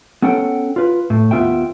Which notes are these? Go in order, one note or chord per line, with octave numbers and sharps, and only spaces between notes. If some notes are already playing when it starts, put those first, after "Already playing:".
B3 C#4 A4 F#5 G5
F4 B4
A2
D#2 B2 B3 F4 E5 G5